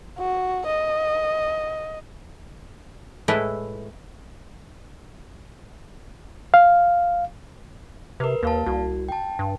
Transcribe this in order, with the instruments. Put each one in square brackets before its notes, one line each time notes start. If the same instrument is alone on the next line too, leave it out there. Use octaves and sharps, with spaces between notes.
[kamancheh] F#4
D#5
[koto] A2 G#3 A3 E4 B4
[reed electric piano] F5
[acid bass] C3 [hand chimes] A#4 B4
[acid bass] D#2 [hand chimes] A#3 F5 A5
[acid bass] C2 [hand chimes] F#4
[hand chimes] G5 A5
[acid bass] G2